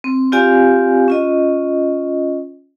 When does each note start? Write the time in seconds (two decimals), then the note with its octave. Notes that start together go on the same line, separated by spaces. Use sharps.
0.04 C4
0.32 C4 F4 G4 D5 F5 G#5
1.08 C#4 F4 D#5